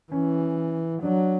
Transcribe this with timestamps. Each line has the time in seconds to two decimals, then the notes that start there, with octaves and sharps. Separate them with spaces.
0.12 E3 C#4
1.03 F#3 D4